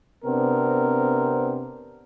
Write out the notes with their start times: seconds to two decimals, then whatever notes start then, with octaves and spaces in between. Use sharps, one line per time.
0.25 C3 B3 C4 D4 A#4